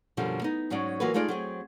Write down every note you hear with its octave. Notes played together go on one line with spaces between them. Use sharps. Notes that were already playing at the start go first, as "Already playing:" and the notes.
F#2 B2 D3 F3 G3
B3 D#4
G#2 F#3 C#4 D#4 D5
E3 F#3 A#3 F4 F#4 B4
G#3 A3 D#4 F4 G#4 D5
F#3 C4 G#4